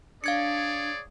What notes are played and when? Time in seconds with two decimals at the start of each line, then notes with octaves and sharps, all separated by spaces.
0.24 D4 G#4 C#5 D5 F5 G#6 C#7